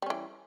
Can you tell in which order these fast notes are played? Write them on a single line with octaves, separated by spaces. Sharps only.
G3 C#4 E3